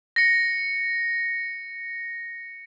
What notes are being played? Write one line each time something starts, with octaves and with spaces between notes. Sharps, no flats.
A#6 C#7